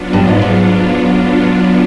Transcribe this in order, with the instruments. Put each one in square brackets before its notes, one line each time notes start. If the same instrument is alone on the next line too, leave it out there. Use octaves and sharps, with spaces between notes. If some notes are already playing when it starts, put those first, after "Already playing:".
Already playing: [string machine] F#3 B3 D4 F4
[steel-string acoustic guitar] G2
G#2
G#2